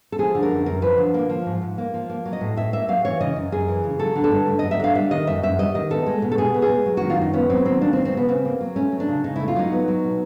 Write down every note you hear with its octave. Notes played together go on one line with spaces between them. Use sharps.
A4
F3 G#4
D3
A#4
F#2
F#2 A#4
F3 B4
D3
A#3
F3
G#2
G#2
A#3
F3
A#3
F#3
D#5
A2
A2 E5
A#3 E5
F#3 F5
E3 C#5
C#3 D#5
F#2
F#2 G#4
E3
C#3
F#3 A4
D3
A4
G2
A3
F#3 D#5
E5
D3 F5
G3 E5
D#3 D#5
F#2 E5
F#2 E5
G3 D#5
D#3 D#5
B3 A4
G#3
B2
A4
B2 G#4
B3
G#4
G#3
F#3
D#3 F#4
F4
F#2 D#4
B3 C#4
F#3 C4
D#3 C4
A#3 D4
C4
F#3
C4
C#3 B3
C#3 C4
A#3
F#3
A3 C#4
F#3
D4
C#3
C#3 D#4
A3 E4
F4
F#3 D#4
B3
F#3
B2